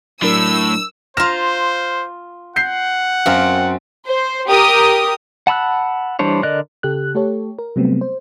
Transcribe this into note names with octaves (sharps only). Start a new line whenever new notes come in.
A2 F#3 D4 A#4 E6
F4 C5 A#5 F6 A#6 E7
F#5 G6 C7
F#2 C4 A#4 F5
C5
G4 A#4 D#6
F#5 A5 B5 E6 F#6
E3 G3 D4 C5 C#5
D3 A#4 D5 D#5 F#6
C#3 G4 A4 F#6
A3 G4 A4 C#5
A#4
C3 F#3 G3 A3 B3 C4
C5